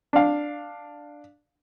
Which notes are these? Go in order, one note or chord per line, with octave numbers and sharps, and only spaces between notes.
D4 F5